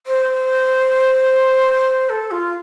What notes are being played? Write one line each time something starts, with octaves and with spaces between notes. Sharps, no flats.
C5
A4
F4